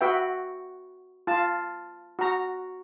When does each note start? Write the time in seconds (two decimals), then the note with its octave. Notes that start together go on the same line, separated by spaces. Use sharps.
0.01 F#4 B4 E5 G5
1.27 F4 A5
2.19 F#4 A#5